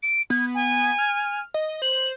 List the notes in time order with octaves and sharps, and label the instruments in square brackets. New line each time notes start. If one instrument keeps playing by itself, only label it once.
[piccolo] D7
[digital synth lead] B3 [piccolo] G#6
[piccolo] G#5
[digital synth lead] F6
D#5
[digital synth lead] C5 [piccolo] F#7